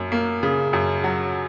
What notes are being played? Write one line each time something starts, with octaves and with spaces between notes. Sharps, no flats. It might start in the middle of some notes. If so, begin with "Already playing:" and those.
Already playing: F#2 A#3
A#3
C#3
F#2
F#3